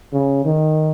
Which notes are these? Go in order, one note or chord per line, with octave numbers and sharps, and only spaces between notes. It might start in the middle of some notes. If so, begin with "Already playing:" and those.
C#3
D#3